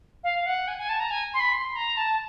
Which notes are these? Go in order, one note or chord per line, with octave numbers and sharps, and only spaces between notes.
F5
F#5
G#5
G#5
A5
A#5
G#5
C6
B5
C6
A#5
A5